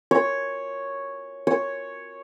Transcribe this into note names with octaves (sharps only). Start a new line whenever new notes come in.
C#5
C#5